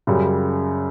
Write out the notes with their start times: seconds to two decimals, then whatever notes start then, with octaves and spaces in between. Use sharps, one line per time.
0.07 F#2 C#3 G3